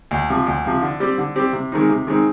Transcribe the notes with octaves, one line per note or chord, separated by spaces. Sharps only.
D2
C3 F3
D2
C3 F3
D3
G3 C4 G4
D3
G3 C4 G4
C3
D#3 G#3 C4 D#4
C3
D#3 G#3 C4 D#4